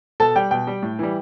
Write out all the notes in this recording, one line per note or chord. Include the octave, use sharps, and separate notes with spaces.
B2 A4 A5
G3 G5
B2 G5
G3
A2
E3 G3